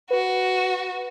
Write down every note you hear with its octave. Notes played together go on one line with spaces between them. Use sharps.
F#4 B4